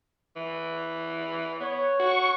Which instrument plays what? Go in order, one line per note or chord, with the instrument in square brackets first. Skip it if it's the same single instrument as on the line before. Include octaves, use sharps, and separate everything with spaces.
[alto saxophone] E3
[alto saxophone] B3 [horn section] C#5
[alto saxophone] F#4 [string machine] C#6